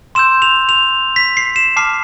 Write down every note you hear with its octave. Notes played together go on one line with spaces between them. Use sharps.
C6 E6 G6 E7
F7
F7
B6
C7
E7
A5 D6 F6 C7